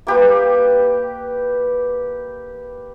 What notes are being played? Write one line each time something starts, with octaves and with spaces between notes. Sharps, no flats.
A#3 G4 B4